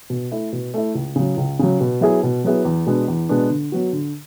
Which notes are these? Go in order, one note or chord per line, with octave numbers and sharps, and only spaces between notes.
B2
A3 E4
B2
A3 E4
C#2
C#3 F#3
C#2
C#3 F#3
B2
F#3 B3 E4 G#4
B2
F#3 B3 E4 G#4
E2
B2 G#3 B3 D4
E2
B2 G#3 B3 D4
D3
F#3 B3 F#4
D3